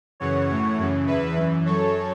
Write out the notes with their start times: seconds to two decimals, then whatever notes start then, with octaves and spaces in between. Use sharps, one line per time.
0.20 F#2 C#3 E3 C#5 F#5
0.49 A2 E3
0.79 F#2 C#3 E3
1.07 E2 E3 B4 E5
1.36 F#2 E3
1.65 F#2 F#3 A4 C#5